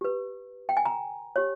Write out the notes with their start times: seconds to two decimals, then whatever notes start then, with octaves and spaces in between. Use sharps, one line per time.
0.01 G4 B4
0.69 G5
0.77 G#5
0.85 A#5
1.36 G4 C#5